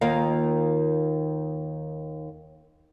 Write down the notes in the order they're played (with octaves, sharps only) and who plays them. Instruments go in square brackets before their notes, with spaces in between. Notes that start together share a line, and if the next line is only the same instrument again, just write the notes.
[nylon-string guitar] D#2 D#3 A#3 F4 A#4 F5